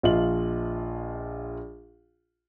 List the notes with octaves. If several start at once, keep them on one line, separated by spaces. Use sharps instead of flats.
A#1 F4 D#5 E5 F#7